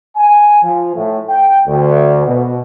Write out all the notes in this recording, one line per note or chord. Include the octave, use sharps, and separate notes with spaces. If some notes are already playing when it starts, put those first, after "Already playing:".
G#5
F3
A2
G5
D2
B2